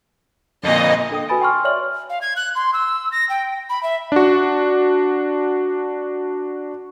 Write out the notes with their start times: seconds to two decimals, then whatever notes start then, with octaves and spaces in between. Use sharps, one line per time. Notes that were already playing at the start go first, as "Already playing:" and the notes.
0.64 F2 A#2 D#5
1.11 D4 A4 G5 D#6
1.28 F#4 B4 G#5 B5 A6 D7
1.42 G5 G#5 C6 C#6 F6
1.64 C#5 D5 E5 C6 F6 F#7
2.10 F5
2.21 G#6
2.36 F#6
2.55 C6
2.73 E6
3.12 A#6
3.29 G5
3.69 B5
3.83 E5
4.12 D4 F#4